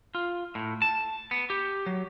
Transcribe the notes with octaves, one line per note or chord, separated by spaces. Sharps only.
F4
A2
A5
B3
G4
F#3